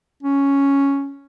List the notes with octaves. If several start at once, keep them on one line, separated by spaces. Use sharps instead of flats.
C#4